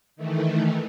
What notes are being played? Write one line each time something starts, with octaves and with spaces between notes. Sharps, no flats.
D#3 E3 A3